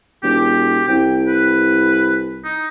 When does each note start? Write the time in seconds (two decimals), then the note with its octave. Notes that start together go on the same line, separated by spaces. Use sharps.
0.23 E1 G4
0.88 C2 G5
1.27 B4
2.44 D#4